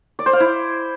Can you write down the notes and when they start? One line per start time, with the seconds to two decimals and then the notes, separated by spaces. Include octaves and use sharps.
0.19 D5
0.26 C5
0.33 F5
0.40 E4